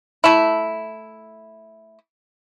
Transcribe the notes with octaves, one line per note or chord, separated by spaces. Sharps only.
A3 E4